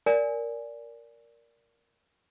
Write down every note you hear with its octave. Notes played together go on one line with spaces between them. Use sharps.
A#4 D5 G#5